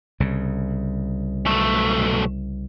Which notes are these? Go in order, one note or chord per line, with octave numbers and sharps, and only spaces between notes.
C2 C#3
B1 A3